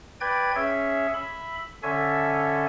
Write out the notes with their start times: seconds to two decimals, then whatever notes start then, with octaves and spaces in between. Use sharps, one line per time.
0.21 B4 D5 G5 G#6
0.55 C#4 G#4 C#5 E5
1.14 E5 B5
1.83 D3 C#4 A4 C#5 E5 G#5